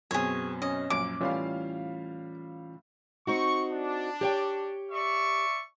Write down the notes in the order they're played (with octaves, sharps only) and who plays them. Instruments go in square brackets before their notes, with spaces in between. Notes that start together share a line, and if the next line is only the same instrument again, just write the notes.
[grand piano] F#2 B2 C4 [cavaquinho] G#4 C#5
[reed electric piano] C#4 [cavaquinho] D#5
[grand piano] A#1 F#2 D7 [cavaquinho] D6
[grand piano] A2 G3 F5 [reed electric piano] E3 C#4 F4
[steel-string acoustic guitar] C4 D#4 F#4 [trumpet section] C#6
[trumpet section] D4
[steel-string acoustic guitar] G4 C#5 G5
[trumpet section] D5 E5 C#6